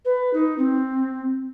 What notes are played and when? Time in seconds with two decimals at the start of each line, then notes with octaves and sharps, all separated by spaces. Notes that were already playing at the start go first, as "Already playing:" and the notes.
0.05 B4
0.33 D#4
0.58 C4